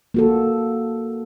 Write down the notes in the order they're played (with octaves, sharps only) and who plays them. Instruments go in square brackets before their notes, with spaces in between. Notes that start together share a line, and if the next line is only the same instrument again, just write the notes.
[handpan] A#3 F#4 A4